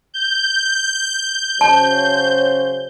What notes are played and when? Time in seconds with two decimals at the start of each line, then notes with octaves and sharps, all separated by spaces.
0.14 G6
1.61 C#3 F#3 C5 A5